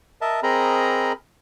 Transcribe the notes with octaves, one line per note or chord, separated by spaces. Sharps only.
A#4 D#5 E5 A5
C4 G#4 A#4 D#5 A#5 B5